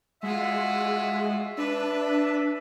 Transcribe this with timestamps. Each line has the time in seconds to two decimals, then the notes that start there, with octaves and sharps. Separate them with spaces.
0.23 G#3 F4 F#4 E5
1.57 D4 B4 E5